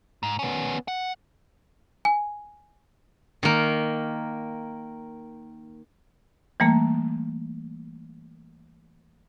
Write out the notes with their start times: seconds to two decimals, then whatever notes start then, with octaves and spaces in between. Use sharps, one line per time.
0.23 G#2
0.39 B3 C#4
0.88 F#5
2.05 G#5
3.43 D#3 A#3
6.60 E3 G3 A3 A#3